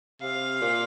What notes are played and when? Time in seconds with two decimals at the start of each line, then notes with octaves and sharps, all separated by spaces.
0.21 C3 F5
0.61 A#2